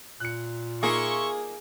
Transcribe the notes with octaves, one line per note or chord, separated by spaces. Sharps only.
A#2 F#6 C#7
A#3 D#4 F4 G#4 E5 C6 C#6